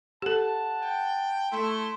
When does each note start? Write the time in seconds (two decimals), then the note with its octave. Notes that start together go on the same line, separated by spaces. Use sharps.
0.22 G4 A4 F#5 A5
0.82 G5
1.52 A3 E4 C6